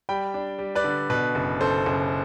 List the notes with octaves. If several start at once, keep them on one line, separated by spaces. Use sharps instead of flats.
G3 G5 B5
D4
G3
B4 D5
D3
B2 B4
F#1
F#1 A4 C5
F#1